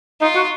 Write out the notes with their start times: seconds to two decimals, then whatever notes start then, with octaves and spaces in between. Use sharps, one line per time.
0.21 D#4 F4
0.35 F#4